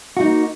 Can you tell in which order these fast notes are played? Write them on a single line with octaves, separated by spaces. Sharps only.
F#4 D#4 A#3